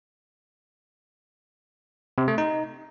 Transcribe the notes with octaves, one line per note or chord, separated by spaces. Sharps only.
C3
A3
D#4